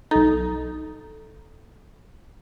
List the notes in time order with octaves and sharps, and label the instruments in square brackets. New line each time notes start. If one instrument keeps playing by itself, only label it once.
[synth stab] B1 D#4 [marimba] A4